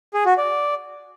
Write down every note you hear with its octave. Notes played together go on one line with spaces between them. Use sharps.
G#4
F#4
D5